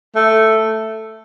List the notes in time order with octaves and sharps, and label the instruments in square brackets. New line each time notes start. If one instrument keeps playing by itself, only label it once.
[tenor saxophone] A3